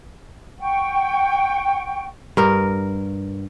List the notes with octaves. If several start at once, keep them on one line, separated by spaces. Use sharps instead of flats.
F#5 G5 C#6
G2 A#4